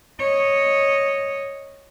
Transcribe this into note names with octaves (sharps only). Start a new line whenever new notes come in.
C#5 D#5